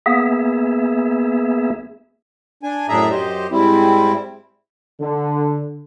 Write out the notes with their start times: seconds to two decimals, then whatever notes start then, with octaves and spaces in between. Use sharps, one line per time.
0.06 A#3 B3 G#4 E5
2.63 D4 G#5
2.89 F#2 A2 D4 G#4 E5 A#5
3.11 F#2 G4 C5 D#5
3.51 G#2 G3 C4 E4
5.01 D3